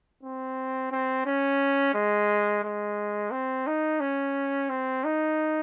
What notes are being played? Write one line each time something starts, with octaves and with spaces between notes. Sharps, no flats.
C4
C4
C#4
G#3
G#3
C4
D#4
C#4
C4
D#4